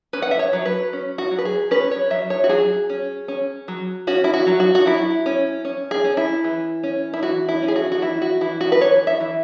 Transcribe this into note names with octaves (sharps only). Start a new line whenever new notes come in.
C#4 B4
F#5
E5
C#5
F#3
B4
C#4
F#4
F#3
B4
G#4
C#4 B4
C#5
F#3 E5
C#5
F#4
F#3 G#4
C#4
C#4
F#3
C#4 F#4
E4
F#4
F#3
F#4
F#4
F#3 E4
C#4
C#4
G#4
C#4
E4
E3
C#4
E4
E3 F#4
E4
C#4
G#4
F#4
F#4
E3 E4
F#4
E3 E4
F#4
B4
E3 C#5
E5
E3